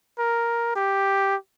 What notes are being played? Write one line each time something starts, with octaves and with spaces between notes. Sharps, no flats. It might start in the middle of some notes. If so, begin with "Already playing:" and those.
A#4
G4